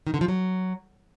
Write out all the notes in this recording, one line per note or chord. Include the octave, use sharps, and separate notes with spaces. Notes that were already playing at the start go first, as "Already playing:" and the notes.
D#3
D3
F3
F#3